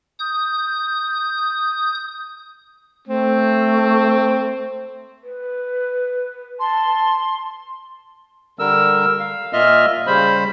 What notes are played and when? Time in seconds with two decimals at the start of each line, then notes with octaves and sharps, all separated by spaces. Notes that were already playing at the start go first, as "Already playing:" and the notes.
0.19 D#6 G6
3.07 A3 C4
5.23 B4
6.60 A5 C6
8.59 D3 G3 A#4 E6
9.19 F5
9.53 A#2 F4 D#5 E5 F6
10.07 C#3 G3 C5 B5